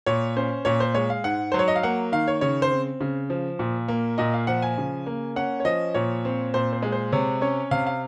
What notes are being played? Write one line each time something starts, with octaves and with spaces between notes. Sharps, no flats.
A#2 C#5
C#4 C5
A#2 C#5
C5
G#3 C#5
F5
G#2 F#5
F#3 C5
C#5
D#5
F5
A#3 F#5
D#3 F5
C#5
C#3 C#5
C5
C4
C#3
F3
A#2
A#3
A#2 D#5
F5
F3 F#5
G#5
C#3
A#3
C#4 F#5
C#5
F3 D#5
A#2 C#5
C4
A#2 C5
C5
G#3
C5
C3 C#5
C#4 C#5
C3 F5
F5